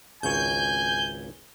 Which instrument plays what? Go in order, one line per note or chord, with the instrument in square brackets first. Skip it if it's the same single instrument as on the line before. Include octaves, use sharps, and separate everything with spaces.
[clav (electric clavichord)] G#1 C#2 C#5 [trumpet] G#5 [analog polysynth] G6